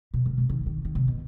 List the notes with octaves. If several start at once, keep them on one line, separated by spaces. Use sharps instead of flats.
B2
D#3
C3
D#3
D#3
D#3
C3
B2